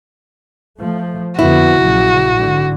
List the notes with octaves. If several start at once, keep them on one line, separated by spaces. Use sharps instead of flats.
F3 A3
F2 D3 B3 E4 F#4
A#1 C#3 F#3
G#2 D3